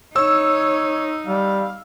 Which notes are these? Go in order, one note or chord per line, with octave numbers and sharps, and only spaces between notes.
D#4 C#5 E6
G3 F5